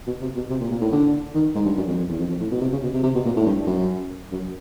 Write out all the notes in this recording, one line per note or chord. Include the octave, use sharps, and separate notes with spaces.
B2
C3
B2
C3
A#2
A#2
A2
D3
D#3
G#2
G2
F#2
F2
F2
E2
F2
F2
A2
B2
C3
C#3
B2
C3
C3
B2
A#2
A2
G2
F#2
F#2